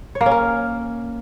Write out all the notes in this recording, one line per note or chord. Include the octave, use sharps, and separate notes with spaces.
C#5
A#3
C#4
A#4